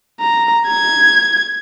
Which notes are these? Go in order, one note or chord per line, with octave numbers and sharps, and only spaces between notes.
A#5
G#6